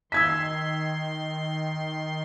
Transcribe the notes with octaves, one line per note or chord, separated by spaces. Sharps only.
D#3 C6 E6 G#6 B6